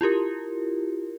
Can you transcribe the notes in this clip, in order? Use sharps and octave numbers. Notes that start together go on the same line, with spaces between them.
E4 F4 G4 A#4